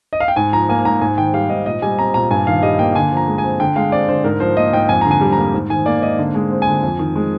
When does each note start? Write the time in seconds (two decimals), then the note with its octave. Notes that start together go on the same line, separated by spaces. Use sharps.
0.13 D#5
0.20 F5
0.28 G5
0.36 G#2 G#5
0.53 F3 A#5
0.69 A#3 G#5
0.85 G#2 A#5
1.01 G#2 G#5
1.17 D#3 G5
1.34 G3 F5
1.49 G#2 D#5
1.66 A#2 D#5
1.82 G3 G#5
1.98 C4 A#5
2.14 A#2 A#5
2.31 G2 G#5
2.47 D#3 F5
2.62 G3 D#5
2.79 A#3 G5
2.95 D3 G#5
3.11 F3
3.17 A#5
3.28 G#3
3.38 G#5
3.44 C4
3.60 D3 G5
3.76 G#3 F5
3.92 C4 D5
4.08 D3 C5
4.24 G#2 A#4
4.40 F3 C5
4.57 A#3 D#5
4.73 G#2 G5
4.89 F2 G#5
5.01 D3 A#5
5.11 G#5
5.21 G3
5.32 A#5
5.37 A#3
5.54 G#2
5.70 D#3 G#5
5.86 A#3 D5
6.02 G#2 D#5
6.19 D3
6.35 G#3
6.51 C4
6.62 G#5
6.67 D3
6.83 F2
6.99 D#3
7.16 G#3